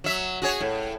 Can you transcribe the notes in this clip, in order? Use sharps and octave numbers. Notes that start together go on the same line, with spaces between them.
F#3 E5
F#4 G#4 C#5
A2